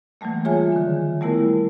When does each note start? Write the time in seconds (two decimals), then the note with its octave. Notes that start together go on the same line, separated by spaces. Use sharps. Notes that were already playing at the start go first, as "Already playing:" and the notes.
0.21 E3 F#3 G3 A3 A#3
0.45 F4 G#4 C#5 E5 G#5
0.72 D3 D#3
1.21 G3 A3 B3 E4 A#4